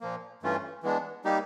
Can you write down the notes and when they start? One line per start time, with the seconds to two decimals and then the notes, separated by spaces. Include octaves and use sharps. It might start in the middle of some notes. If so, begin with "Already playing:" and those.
0.01 A#2 F3 A#3
0.43 G2 E3 A3 C#4 F4
0.83 E3 G#3 B3 D4
1.24 G3 A#3 D#4 G4